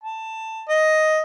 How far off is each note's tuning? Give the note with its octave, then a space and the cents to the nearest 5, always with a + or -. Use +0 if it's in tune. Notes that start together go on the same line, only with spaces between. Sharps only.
A5 +10
D#5 +5